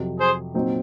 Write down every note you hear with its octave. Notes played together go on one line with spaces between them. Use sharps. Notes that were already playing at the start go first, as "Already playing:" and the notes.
Already playing: F2 C3 F#3
G#4 C5
A#2 F#3 C4 D#4